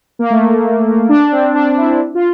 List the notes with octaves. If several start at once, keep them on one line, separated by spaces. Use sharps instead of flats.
A#3
A3
D4
C4
D4
E4
F4